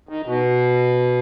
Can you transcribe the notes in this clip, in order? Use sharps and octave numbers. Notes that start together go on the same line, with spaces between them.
D#3
B2